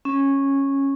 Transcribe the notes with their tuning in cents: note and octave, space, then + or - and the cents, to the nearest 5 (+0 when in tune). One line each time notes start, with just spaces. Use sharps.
C#4 -10